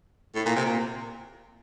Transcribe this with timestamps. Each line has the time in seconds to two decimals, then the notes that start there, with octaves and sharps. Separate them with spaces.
0.35 A2
0.46 A#2
0.56 C3
0.65 A#2